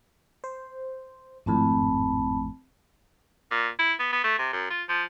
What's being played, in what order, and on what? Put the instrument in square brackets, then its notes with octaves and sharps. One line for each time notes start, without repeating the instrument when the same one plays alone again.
[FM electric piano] C5
[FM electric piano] G#1 F2 A2 [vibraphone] C4 A5 B5
[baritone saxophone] A#2
E4
B3
B3
A3
C3
F#2
F4
F3